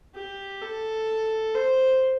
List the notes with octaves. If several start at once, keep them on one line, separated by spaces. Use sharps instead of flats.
G4
A4
C5